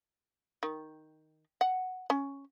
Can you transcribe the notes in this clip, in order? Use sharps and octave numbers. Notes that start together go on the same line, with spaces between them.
D#3
F#5
C#4